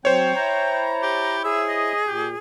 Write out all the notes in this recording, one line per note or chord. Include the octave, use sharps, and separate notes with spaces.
F#3 C4 C5 C#5 G5
E4 A#5
G4
G#4 E5
D#5
A#2 G4